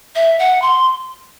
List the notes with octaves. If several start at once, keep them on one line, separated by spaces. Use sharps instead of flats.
E5
F#5
C6